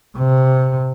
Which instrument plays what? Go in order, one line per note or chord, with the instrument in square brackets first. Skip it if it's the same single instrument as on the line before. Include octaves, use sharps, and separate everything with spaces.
[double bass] C3